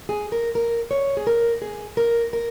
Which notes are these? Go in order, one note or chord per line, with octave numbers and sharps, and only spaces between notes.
G#4
A#4
A#4
C#5
G#4
A#4
G#4
A#4
A#4